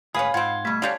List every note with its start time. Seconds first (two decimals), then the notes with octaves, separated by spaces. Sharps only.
0.14 D2 G#2 C#4 G#4 B4 F5 B5
0.34 G#2 C4 D#4 F4 F#5 G#6
0.65 B2 G3 A3 G#6 B6
0.82 D3 G3 C#4 D4 C#5 F5